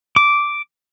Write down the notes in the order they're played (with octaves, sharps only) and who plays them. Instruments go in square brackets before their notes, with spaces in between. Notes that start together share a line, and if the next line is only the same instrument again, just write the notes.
[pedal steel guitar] D6